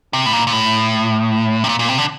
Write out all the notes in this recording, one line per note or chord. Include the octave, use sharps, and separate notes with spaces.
C3
A2
A#2
A#2
A2
C3
A#2
A#2
C3
D3